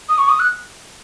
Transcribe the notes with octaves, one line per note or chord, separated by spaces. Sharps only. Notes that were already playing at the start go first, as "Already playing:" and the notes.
D#6
C#6
D#6
F#6